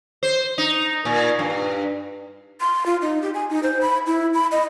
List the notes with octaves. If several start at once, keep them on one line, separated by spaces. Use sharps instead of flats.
C5
D#4
A#2
G2
C6
F4
D#4
G4
G#5
D#4
C5
B5
E4
B5
D#5